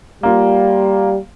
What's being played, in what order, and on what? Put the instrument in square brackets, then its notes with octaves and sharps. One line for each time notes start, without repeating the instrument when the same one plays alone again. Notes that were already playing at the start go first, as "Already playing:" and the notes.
[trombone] G3 [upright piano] A#3 F4